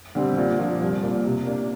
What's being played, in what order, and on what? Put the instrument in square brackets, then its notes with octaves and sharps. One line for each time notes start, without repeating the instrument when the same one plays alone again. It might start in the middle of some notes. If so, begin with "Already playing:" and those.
[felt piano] D3 G3 C4
A#2
F3 A#3 D4
C2
A#2 A#3 D4
C3
A#3 D4